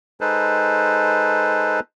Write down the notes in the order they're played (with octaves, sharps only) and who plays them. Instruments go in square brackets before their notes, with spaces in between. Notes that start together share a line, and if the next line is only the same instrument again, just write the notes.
[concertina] G#3 D#4 A4 B4 C5